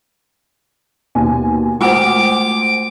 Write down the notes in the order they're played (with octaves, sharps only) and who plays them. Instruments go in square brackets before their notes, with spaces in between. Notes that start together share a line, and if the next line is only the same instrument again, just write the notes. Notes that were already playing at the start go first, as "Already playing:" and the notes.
[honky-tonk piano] D#2 B2 G#5
[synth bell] G#3 A3 F#5 [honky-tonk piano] C5 G#5 [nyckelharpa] D6